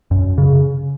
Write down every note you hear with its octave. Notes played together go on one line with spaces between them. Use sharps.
F#2
C#3